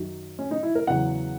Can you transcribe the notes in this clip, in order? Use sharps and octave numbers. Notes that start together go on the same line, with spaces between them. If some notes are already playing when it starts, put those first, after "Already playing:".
Already playing: F#2 D#3 F#3
C#4
D#4
E4
A#4
E2 C#3 F#3 F#5